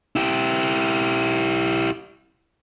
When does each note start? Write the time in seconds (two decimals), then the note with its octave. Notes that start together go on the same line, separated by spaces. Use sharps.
0.16 E4 G4